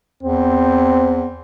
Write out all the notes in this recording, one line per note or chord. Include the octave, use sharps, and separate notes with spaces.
E2 C4